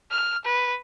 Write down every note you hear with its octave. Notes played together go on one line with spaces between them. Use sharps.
F6
B4